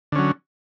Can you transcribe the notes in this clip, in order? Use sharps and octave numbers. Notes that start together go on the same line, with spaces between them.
D3 F#3 C#4